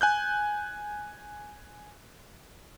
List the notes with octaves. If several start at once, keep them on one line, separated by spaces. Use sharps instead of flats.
G#5 F#6 G6